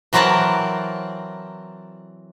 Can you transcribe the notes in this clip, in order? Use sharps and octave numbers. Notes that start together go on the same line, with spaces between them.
E3 F#3 C4 A#4 D5 A5